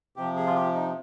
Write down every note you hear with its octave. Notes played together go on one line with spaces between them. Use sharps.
C3 F3 G4
G#4
F4
G4
D#4